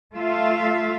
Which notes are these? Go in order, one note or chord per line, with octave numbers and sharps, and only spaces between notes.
A3 F4 E5 F5